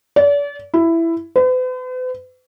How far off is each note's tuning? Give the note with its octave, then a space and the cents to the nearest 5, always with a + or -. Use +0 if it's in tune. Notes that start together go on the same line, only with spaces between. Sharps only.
D5 -40
E4 +10
B4 +45